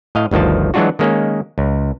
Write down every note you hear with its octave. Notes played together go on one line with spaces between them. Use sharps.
A2 D#5 F5
G1 D2 D#3 F3 A5
E3 F#3 G#3 D4 F4 F#4
D#3 G#3 A#3 C#4
C#2